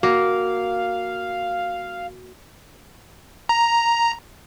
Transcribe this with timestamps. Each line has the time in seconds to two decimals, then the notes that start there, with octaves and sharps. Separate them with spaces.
0.03 A#3 F#4 F5
3.49 A#5